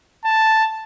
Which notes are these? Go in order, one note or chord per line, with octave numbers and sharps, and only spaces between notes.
A5